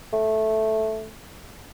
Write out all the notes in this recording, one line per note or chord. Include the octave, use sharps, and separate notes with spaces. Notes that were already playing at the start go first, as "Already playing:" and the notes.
A3